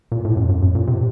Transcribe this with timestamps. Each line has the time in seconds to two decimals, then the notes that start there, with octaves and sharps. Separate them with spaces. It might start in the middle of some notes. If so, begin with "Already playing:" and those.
0.12 A#2
0.25 A2
0.37 F#2
0.49 F#2
0.62 F#2
0.75 A#2
0.87 C3